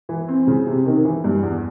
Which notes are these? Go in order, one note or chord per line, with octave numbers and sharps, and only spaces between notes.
E3
C4
C#3
C3
D#3
E3
G2
E2